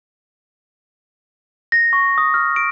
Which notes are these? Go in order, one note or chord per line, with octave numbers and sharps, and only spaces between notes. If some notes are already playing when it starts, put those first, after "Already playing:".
A#6
C#6
D#6
F6
D7